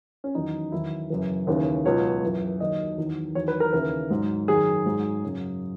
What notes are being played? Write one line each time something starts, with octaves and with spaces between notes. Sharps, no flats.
C#4
E2 D#3 F#3 D#4
E2 D#3 F#3 E4
F#2 C#3 E3
D#2 C#3 E3
C#2 B2 F#3 C#5
F#2 E3
D#2 D#3 F#3 D#5
E2 D#3 F#3
E2 D#3 F#3 C#5
B4
A#4
D#2 C#3 E3 A#4
G#2 F#3
F#2 D#3 F#3 G#4
G#2 F#3
F#2 C#3 F#3